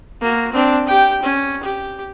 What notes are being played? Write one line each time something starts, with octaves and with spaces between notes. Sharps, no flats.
A#3 F#4
C4 D4
G4 G5
C#4
G4